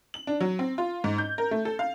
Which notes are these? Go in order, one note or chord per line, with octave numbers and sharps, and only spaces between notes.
F#7
D4
F#3
C4
F4
G#2
G6
A#4
A3
A4
F5